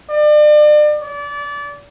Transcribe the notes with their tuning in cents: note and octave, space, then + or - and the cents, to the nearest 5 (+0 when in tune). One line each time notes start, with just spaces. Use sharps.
D5 +35
D5 -25